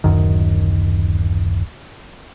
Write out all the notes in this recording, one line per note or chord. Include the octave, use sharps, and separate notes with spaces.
D1 F#2 D#3